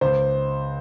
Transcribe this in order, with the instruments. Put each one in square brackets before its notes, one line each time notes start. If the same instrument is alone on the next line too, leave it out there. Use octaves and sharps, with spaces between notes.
[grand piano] C#2 C5